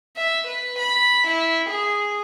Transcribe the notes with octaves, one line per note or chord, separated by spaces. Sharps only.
E5
B4
B5
E4
G#4